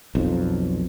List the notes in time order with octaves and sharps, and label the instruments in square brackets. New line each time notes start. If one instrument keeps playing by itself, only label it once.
[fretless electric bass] B1 F2